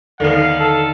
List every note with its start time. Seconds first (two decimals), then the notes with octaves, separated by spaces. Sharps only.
0.20 D#2 D3 B3 D#4 F5 A5
0.60 A4